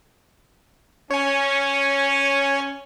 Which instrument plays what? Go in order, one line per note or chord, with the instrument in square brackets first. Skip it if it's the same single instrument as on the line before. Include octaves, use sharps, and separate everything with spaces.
[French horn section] C#4 [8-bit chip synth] C#5 G#5